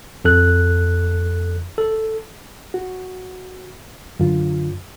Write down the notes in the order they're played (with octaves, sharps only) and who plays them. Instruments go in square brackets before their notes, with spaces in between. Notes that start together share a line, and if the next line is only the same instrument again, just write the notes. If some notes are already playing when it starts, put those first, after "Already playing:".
[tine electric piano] F2 A4 F#6
A4
[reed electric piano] F#4
F#2 D3 F4